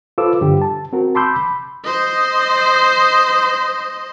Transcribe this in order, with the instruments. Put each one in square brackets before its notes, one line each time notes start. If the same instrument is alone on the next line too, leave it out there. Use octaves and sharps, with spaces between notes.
[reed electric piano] F4 A4 B4 C5 D6 E6
G2 D3 G4
A5
C4 F#4 A#4
A5 B5 C6 D6 E6 G6
B5
[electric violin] C5 D#5